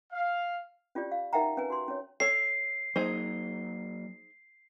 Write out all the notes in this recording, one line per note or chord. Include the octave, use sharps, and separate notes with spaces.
F5
C#4 F4 G4 D5
F5
D#4 A#4 E5 F#5 G5 A#5
C#4 B4 G#5
F#4 C6
C#4 C#5
A4 C#5 C7
F#3 A#3 D#4 G#4 C5